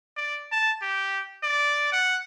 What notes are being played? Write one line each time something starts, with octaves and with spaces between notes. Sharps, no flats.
D5
A5
G4
D5
F#5